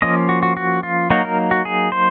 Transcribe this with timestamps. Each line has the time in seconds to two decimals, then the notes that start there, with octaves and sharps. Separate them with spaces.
0.02 F3 A#3 C#4 D#5
0.29 F#4
0.43 F#4
0.57 F#4
0.83 F4
1.10 F#3 A#3 D#4 F#4
1.25 A#4
1.51 F#4
1.65 G#4
1.92 C5